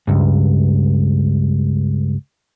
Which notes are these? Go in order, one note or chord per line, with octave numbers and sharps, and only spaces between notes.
C#2 G2